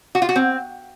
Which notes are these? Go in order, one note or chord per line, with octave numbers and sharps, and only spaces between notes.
F#4
F4
F#4
C4